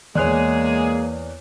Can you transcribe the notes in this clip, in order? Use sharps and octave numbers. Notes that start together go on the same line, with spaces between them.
E2 G#3 A#3 G#4 C#5 D5 F#6 F7